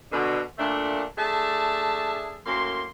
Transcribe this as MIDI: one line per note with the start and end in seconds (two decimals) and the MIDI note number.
0.12 0.41 47
0.12 0.41 50
0.58 1.03 46
0.58 1.03 57
0.58 1.03 62
1.17 2.40 57
1.17 2.40 62
1.17 2.40 68
1.17 2.40 76
1.17 2.40 81
2.46 2.86 42
2.46 2.86 45
2.46 2.86 58
2.46 2.86 84